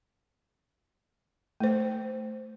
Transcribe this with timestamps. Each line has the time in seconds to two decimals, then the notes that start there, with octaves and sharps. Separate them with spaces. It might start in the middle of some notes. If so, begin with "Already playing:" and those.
1.60 A3 C5